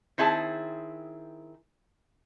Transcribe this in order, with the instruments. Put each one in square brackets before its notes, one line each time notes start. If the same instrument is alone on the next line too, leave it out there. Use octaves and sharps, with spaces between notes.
[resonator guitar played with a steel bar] D#3 C4 E4 G#4 B4 A5